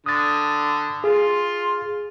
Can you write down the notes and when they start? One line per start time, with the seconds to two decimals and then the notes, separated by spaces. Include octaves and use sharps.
0.06 D3 D#6 A6
1.04 F4 G#4 C6